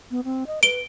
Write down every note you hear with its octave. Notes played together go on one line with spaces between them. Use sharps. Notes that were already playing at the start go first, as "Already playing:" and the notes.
B3
C4
D#5
B4 D7 G7